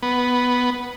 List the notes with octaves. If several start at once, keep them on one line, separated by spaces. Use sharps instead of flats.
B3